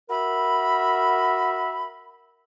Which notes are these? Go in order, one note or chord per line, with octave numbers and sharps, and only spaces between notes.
F#4 A#4 E5 B5